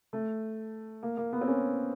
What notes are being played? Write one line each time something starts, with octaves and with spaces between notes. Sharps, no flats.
A3
A#3
A#3
B3
C4
C#4